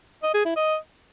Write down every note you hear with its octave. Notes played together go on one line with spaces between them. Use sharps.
D#5
G#4
E4
D#5